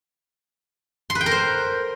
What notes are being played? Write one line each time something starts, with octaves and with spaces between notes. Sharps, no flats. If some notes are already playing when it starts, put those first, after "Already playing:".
C6
B4
G5
A#4
C5